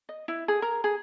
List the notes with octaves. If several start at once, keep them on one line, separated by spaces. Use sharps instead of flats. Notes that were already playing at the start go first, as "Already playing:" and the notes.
D#5
E4
G#4
A#4
G#4